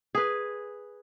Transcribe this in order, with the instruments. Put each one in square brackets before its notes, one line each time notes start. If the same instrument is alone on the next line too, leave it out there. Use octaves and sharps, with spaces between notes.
[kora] G#4 B4